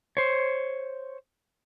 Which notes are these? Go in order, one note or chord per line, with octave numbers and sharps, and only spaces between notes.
C5 C#5